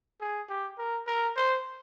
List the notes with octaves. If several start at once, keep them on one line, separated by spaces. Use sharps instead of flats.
G#4
G4
A#4
A#4
C5